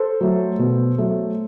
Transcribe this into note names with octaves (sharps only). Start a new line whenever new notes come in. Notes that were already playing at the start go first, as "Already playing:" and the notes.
Already playing: A4 C5
F#3 A3
B2
F#3 A3